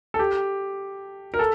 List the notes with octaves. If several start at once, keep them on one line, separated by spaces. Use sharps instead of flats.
A4
G4
A#4
A4